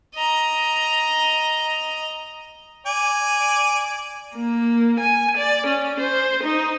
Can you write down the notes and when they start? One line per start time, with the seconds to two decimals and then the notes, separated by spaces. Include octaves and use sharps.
0.15 D#5 A#5
2.86 D5 G#5
4.36 A#3
5.00 G#5
5.37 D5
5.66 C#4
5.99 C5
6.43 D#4